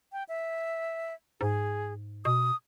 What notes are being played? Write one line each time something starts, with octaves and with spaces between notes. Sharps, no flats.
G5
E5
G#2 G#4
B2 D#6